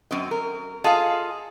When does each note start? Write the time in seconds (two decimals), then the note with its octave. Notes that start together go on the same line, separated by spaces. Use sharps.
0.11 F#2 C4 D#5
0.31 A#4
0.84 F4 G#4 A4 D#5 F5